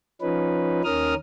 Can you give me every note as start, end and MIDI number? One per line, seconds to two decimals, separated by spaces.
0.21 0.82 53
0.21 0.82 61
0.21 0.82 63
0.21 0.82 71
0.84 1.14 39
0.84 1.14 51
0.84 1.14 61
0.84 1.14 70
0.84 1.14 87
0.84 1.14 89